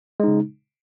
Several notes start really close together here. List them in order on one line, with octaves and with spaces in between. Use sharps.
G#3 D#4 C#3